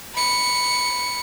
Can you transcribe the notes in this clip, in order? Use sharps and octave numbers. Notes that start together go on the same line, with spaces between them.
B5 C#7